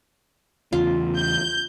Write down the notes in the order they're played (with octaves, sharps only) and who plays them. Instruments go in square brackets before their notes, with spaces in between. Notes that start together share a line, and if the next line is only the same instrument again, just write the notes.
[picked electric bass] E2 C#3 [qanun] F4
[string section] G6